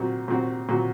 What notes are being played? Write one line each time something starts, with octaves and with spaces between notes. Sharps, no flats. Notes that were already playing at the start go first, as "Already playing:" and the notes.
Already playing: A#2 F#3 C4 F#4
A#2 F#3 C4 F#4
A#2 F#3 C4 F#4